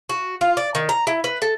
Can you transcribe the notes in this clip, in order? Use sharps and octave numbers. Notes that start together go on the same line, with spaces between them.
F#4
F4
D5
D#3
A#5
E4
B4
A4